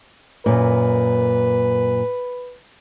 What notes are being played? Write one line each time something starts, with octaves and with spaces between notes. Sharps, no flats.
F#2 A#2 B4